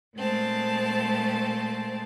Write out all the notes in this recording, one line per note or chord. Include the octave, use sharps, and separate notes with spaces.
A#2 G#3 A3 C4 A5